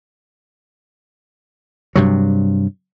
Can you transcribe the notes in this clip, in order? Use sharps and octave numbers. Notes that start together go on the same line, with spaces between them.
G2 C3 F#3